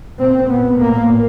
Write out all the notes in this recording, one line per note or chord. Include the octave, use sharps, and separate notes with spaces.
A#2 C4
A#2 B3
A2 A#3